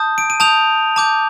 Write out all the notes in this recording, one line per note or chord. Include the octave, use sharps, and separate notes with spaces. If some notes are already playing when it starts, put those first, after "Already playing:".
Already playing: A5 D#6 G6
D7
D#7
A5 D#6 G6 F7
A5 D6 G6